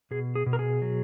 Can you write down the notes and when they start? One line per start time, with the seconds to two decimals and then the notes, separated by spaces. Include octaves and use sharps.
0.11 B2 G#4
0.35 G#4
0.46 B2
0.53 A#4
0.59 G#4
0.82 F#3